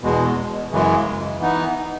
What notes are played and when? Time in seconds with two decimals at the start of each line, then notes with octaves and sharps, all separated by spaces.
0.01 E2 B2 G#3
0.71 F#2 C#3 E3 G#3
1.40 E3 B3 D#4